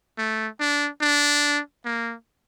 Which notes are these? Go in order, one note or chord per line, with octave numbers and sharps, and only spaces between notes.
A3
D4
D4
A#3